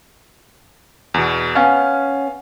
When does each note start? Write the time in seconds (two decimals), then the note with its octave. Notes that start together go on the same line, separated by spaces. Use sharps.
1.14 E2 B2
1.55 B3 C#4 F5 G#5